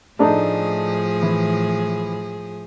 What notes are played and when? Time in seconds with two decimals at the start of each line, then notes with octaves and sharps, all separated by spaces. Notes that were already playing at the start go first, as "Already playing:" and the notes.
0.19 A2 F3 A3 D4 D#4 G#4
1.23 E3